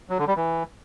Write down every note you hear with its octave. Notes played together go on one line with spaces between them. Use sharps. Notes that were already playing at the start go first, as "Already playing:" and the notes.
F#3
D3
G3
E3